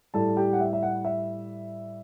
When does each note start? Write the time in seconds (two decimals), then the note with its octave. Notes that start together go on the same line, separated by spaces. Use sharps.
0.14 A2 G3 A4 A5
0.37 G4 G5
0.53 F#5
0.60 E5
0.73 E5
0.83 F#5
1.05 E5